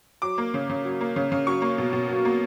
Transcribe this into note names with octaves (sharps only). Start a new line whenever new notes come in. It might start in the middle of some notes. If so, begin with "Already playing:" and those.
F#3 D6
A#3
C#3
C#3
F#3
A#3
C#3
C#3
F#3 C#6
A#3
B2
B2
F#3
A#3